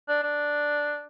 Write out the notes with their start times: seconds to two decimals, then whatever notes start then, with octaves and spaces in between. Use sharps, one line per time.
0.08 D4
0.23 D4